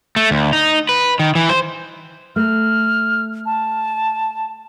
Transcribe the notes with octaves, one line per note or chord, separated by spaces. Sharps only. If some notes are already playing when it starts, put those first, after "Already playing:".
A3
D2
D#4
B4
D#3
E3
C5
A3 F6
A5